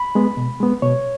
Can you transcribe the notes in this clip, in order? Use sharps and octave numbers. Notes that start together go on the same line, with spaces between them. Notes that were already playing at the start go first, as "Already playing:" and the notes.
Already playing: B5
G#3 B3
B2
G#3 B3
B2 C#5